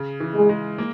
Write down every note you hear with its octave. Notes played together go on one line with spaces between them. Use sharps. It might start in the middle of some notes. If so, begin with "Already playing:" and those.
Already playing: C#3
E3
G#3
G#3
A#3